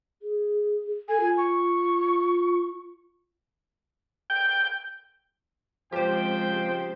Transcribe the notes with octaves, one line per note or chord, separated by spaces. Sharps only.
G#4
A4 G#5
F4
C#6
G5
C#3 F3 G#3 C4 G4 C5 G5